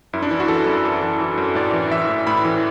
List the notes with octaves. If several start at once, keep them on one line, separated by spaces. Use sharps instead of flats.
F#2 E4
D4
E3 E4
F#4
E3 A4
F#2
F#2
E3
E3
F#2
A2 D5
E3
E3 E5
A2
A2 B5
E3